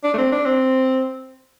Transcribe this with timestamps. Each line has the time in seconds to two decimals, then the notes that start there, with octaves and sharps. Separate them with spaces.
0.04 D4
0.14 A3
0.18 C4
0.32 D4
0.45 C4